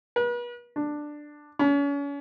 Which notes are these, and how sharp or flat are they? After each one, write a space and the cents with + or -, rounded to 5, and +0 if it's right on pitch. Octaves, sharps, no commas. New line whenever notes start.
B4 -40
D4 +10
C#4 +35